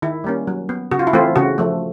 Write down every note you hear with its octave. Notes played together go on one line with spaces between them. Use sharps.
D#3 E4
G3 A#3 C#4
F#3
B3
C#3 F#4
F4
E4
E3 A3 C4 F4
C#3 F#4
F3 A3